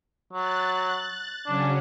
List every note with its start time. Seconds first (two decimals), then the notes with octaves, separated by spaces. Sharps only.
0.33 F#3 F#6 A6
1.47 C#3 F#3 C#4 D4